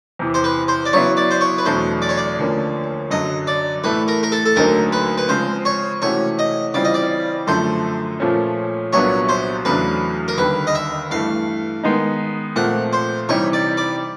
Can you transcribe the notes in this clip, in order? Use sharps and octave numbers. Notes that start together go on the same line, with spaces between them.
E2 C3 E3
C5
B4
C5
D5
C#3 F#3 B3 E4 C#5
D5
C5
C#5
B4
E2 B2 F#3 A3 D4 C5
D5
C#5
D5
D2 D3 F3 A#3 C#4
F#2 D3 F#3 D#5
D5
A2 E3 A3 B4
A#4
A#4
A4
A4
D2 D3 F#3 A#3 D#4 A#4
B4
B4
C#3 F3 G#3 C4 C5
C#5
C3 E3 A3 C#4 F#4 C#5
D#5
C#3 E3 G3 C4 F4 D5
D#5
D5
F#2 D3 F3 A3 C5
A#2 F3 A3 C#4
C2 A#2 F#3 B3 D4 C#5
C5
E2 C#3 F#3 A3 D4 B4
A#4
D#2 D3 G3 B4
D#5
E5
G2 E3 A3 F5
D#3 G#3 B3 D#4
A#2 F3 A3 C4 F#5
C5
C3 E3 G3 C4 D#4 C#5
D5
D5